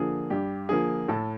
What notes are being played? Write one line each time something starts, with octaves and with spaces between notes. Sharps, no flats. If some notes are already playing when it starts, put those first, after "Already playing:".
Already playing: D3 F3 A#3 G#4
G2 G4
D3 F3 A#3 G#4
A2 A4